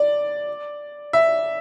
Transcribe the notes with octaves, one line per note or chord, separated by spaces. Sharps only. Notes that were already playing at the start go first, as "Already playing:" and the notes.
Already playing: D5
E5